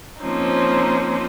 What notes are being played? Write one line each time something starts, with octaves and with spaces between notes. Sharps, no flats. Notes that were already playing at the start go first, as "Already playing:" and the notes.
F3 A#3 C4 C#4 D#4